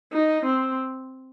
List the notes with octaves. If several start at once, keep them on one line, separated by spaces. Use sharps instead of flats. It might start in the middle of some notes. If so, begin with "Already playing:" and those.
D#4
C4